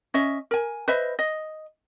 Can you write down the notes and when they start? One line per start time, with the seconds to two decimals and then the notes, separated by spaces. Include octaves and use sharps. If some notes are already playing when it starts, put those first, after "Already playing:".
0.14 C#4 D#5 E5
0.51 A#4 G#5
0.88 B4 C5 D#5 E5
1.19 D#5